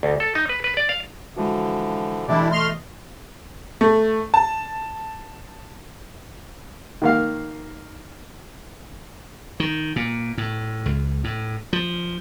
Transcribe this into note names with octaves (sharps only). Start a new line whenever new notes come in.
D2
A4
D#4
B4
B4
D5
F5
D3 E3 F3 G#3 F#4
B2 E3 G#3 A3 D4 E4 G4 D5
A3 D#5 C6 F6
A3
A5
D#3 A#3 F5
D#3
A#2
A2
C#2
A2
F3